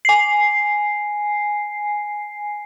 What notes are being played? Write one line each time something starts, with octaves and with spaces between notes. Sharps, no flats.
G#5 C7